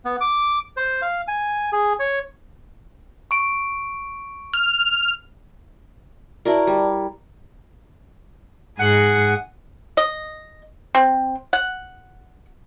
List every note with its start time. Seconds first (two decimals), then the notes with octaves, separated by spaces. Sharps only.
0.05 B3
0.21 D6
0.77 C5
1.02 F5
1.28 G#5
1.73 G#4
1.99 C#5
3.31 C#6 D7
4.54 F6
6.45 E4 F#4 A#4 D5 A5
6.67 G3
8.79 G#2 G#4 F#5
9.97 D#5
10.95 C4
11.53 F#5